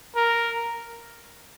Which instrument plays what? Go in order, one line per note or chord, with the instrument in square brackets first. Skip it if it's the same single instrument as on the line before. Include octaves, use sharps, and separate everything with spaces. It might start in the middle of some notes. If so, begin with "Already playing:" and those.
[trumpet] A#4